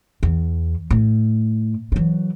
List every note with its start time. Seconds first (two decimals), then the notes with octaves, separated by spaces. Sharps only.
0.23 E2
0.91 A2
1.92 E3 F#3